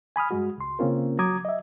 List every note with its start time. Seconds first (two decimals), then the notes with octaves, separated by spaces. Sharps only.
0.16 G#5 B5 D#6 F6
0.31 G2 G#3 F#4
0.58 C#2 C6
0.79 C#3 A#3 C4 C#4 F4 A#4
1.19 F#3 A#5 D6 D#6 G#6
1.45 D#5 E5